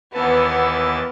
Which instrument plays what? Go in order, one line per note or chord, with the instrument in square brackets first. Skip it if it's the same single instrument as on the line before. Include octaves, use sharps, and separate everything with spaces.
[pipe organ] D#2 E3 A5 [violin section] B3